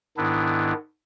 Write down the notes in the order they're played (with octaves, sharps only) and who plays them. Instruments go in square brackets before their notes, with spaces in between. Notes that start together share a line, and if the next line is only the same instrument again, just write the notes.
[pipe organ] G#2 D#3 B3 D4 E4